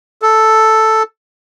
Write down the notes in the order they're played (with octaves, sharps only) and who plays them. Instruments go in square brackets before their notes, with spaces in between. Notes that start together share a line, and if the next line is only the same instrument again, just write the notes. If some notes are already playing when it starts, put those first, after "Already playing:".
[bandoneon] A4